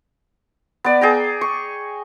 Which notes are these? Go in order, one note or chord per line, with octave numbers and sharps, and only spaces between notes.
B3 D5
G#4 G5 A#5
C#6